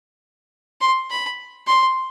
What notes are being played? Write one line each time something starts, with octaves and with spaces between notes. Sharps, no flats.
C6
B5
C6